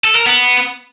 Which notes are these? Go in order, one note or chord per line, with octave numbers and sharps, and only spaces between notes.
A4
A#4
B3